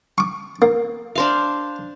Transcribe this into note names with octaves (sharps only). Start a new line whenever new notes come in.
C#6 D6
A#3
D4 C5 F5